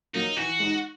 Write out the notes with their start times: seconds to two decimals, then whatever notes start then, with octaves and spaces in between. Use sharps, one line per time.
0.14 F#3 A#3 D#4
0.37 E3 F#4
0.60 G#3 D#4